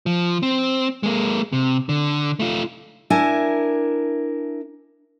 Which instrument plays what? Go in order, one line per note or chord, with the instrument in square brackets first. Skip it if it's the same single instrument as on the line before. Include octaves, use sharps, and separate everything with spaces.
[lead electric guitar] F3
C4
G#3 A#3
C3
D3
A3 F4
[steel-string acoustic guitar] D4 E4 A#4 G#5